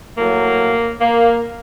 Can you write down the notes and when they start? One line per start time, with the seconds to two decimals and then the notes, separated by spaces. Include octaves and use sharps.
0.16 A2 F#3 A#3
1.01 A#3